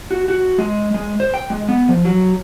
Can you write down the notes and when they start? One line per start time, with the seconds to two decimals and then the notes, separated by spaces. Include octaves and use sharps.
0.11 F#4
0.28 F#4
0.58 G#3
0.94 G#3
1.20 C5
1.34 G5
1.50 G#3
1.69 B3
1.88 F3
2.05 F#3